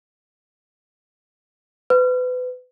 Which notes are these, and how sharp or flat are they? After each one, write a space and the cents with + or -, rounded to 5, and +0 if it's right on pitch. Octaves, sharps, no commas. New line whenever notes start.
B4 +30